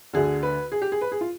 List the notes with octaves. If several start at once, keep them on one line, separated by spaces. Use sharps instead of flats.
D2 D3 G#4
B4
G#4
G4
G#4
B4
G#4
F4